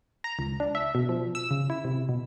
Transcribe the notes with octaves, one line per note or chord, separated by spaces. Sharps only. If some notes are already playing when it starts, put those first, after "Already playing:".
A#5
C#2
D4
E5
B2
F3
E6
C#3
E4
C3
B2